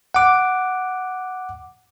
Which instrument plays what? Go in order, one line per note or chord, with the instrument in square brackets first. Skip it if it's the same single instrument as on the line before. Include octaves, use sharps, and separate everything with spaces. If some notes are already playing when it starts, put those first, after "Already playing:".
[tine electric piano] F#5 D6